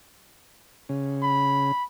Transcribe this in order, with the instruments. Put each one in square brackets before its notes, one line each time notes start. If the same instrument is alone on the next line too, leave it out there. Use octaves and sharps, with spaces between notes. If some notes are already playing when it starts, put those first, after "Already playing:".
[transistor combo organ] C#3
[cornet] B5